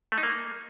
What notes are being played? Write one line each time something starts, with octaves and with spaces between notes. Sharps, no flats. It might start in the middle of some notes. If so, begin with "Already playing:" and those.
A3
D#4
A#3